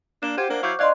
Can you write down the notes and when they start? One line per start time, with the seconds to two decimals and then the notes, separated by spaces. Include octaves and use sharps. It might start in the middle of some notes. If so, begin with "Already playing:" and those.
0.23 A#3 D4 E7
0.38 F4 G4 C5 F#5 G#6
0.49 A#3 D4
0.63 F#3 E4 F5 C#6 D6 G6
0.79 D4 D5 D#5 F5 C6 F#6 G#6